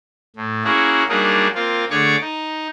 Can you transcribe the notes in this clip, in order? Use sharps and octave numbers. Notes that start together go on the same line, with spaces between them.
A2
A#3 C#4 E4 F#4 G#4
F#3 G3 A#3 D4 D#4 G#4
A#3 C4 F4
D3 A3 G#4 C#5 C#6 D6
D#4